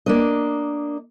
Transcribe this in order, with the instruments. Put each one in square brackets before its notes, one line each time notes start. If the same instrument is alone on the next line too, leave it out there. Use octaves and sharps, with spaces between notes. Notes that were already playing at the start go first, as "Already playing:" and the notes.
[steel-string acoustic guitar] A#3 D4 D#5